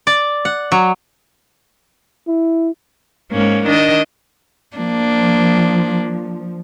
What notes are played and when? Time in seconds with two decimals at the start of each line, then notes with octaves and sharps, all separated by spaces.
0.07 D5
0.45 F#5
0.72 F#3
2.28 E4
3.31 G#2 A#3 C#4
3.66 D#3 D4 D#5
4.77 F3 A#3 D4